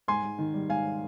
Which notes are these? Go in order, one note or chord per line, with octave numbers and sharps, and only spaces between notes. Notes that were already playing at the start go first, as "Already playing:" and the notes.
G#2 G#5 C6
G#2
D#3
G3
G#2 F5 G#5